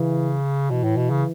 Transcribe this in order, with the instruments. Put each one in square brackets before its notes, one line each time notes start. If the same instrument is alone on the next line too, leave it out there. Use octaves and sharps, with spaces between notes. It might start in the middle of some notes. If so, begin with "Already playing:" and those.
Already playing: [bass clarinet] C#3 [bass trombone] E3
[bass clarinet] B2 [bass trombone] E3
[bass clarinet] A2
B2
C#3